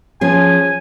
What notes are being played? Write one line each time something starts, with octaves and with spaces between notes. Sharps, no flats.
F3 C#4 G#4 G#5